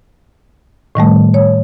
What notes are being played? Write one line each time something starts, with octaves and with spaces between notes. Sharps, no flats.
A2 D#3 G3 A3
C#5